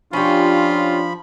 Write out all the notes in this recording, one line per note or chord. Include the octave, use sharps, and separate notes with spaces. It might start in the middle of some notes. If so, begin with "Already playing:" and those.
F3 C#4 D4 F4 G4 B5